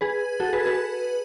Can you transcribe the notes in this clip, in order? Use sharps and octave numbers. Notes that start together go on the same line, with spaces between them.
G#4 B4
F#4 A4
G#4 B4
G#4 B4